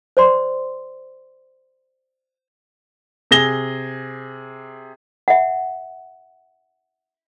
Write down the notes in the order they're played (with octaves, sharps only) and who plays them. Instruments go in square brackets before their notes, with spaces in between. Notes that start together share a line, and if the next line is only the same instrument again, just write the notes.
[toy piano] C5 D5 C6
[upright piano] C3 G#4 A#6 G7
[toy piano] E5 F#5